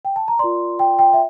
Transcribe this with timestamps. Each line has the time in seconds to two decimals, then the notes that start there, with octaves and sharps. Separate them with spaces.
0.05 G5
0.16 A5
0.28 A#5
0.39 D5 C6
0.42 F4 A#4
0.79 G5
0.99 G5
1.13 E5